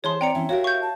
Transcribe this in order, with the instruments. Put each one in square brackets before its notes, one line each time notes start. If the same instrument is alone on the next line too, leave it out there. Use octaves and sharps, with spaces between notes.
[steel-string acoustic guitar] E3 C5 A5 [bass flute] G#4 [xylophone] C#5 C6
[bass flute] C4 [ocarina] D5 [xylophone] G5 A#5 C#7
[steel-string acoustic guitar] E3 C#4 [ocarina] E5
[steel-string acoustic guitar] F#4 G4 A#4 [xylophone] C#5 [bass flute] F5
[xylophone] C#6 G6
[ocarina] A5